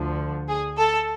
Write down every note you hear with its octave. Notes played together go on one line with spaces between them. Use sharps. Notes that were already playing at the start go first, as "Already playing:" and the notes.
Already playing: D2 D3 F3
G#4
A4